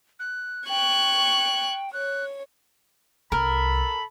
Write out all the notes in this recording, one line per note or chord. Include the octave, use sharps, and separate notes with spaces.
F#6
G5 C#6 F#6 G#6
C#5 F#6
C2 A4 A#4 B5